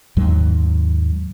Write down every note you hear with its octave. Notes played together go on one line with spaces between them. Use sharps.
D#2 G#2 F#3 G#3